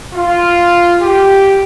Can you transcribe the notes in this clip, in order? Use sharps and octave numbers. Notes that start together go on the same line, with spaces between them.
F4
G4